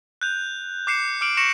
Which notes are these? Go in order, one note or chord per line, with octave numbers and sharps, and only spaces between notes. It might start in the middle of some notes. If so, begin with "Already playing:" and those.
F#6 G6 F7
D6 F#6 C7 C#7 E7
D6 F6 D7 F#7
C#6 A#6 C#7 E7 F#7